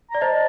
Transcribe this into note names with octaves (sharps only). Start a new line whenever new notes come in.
D5 A#5
C5 D#5 A5